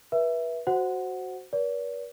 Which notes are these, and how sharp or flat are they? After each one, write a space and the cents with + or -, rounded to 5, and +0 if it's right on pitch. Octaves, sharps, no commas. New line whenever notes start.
B4 -30 E5 +0
F#4 +0 C5 +0 F#5 +0
B4 -45 D5 -45